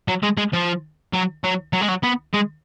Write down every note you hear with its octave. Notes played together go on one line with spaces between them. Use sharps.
F#3
G#3
G#3
F3
F#3
F#3
F#3
G#3
F#3
B3
G#3